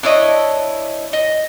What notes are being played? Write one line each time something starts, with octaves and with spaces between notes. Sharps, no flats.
D4 E4 C#5 D#5
D#5